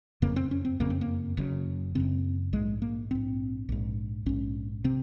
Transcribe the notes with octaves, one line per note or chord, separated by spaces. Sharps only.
F#1 F2 C#3 A#3
C4
C#4
C4
F#1 F2 C#3 A#3
C4
A#3
F#1 F#2 C#3
F#1 F#2 C#3 C4
A#1 G#2 G#3
A#3
A#1 G#2 C4
A#1 G#2
A#1 G#2 C#4
C3 C4